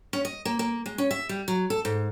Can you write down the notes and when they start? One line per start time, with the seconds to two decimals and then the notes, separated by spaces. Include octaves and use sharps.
0.13 C#4
0.25 D#5
0.45 A#3
0.59 A#3
0.86 G#3
0.98 C#4
1.11 E5
1.29 G3
1.48 F#3
1.70 A4
1.85 G#2